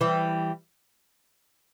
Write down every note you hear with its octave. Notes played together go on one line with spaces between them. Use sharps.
E3 G3